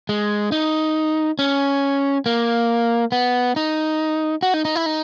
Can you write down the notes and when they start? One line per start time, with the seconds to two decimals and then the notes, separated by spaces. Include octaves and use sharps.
0.09 G#3
0.52 D#4
1.39 C#4
2.26 A#3
3.12 B3
3.56 D#4
4.43 F#4
4.54 D#4
4.65 D#4
4.76 E4
4.86 D#4